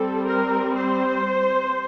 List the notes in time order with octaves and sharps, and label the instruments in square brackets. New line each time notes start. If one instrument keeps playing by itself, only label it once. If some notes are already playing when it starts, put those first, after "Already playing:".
Already playing: [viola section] G3 C4 A4
A#4
C5